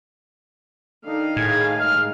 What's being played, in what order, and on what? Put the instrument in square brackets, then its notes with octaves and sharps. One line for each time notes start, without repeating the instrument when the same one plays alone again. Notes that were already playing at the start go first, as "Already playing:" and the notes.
[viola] D#3 F5 [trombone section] D4 D#4 A4
[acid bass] A2 [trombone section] G#4 [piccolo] G#6
[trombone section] G2 G#3 [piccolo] F6